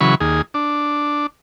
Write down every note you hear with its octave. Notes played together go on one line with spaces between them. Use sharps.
C#3 E3 F#3 B5 C#6
D#2 G#4
D4